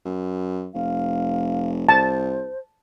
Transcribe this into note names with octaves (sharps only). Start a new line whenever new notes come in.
F#2
F1 F5
C2 C5 A5